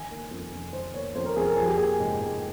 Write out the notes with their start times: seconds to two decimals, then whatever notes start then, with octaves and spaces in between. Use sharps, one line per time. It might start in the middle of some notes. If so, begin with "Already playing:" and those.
Already playing: D#3 G#5
0.10 A#3
0.31 F2
0.52 F2
0.73 D#3 C5
0.94 A#3 C#5
1.15 F2 C5
1.26 A#4
1.36 F2 G#4
1.47 A#4
1.56 F3 G#4
1.67 G4
1.77 A#3 G#4
2.00 G#2
2.21 G#2